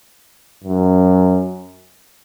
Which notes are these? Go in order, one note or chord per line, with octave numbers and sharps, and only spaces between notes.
F#2